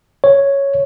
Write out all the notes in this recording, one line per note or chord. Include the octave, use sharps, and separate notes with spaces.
C#5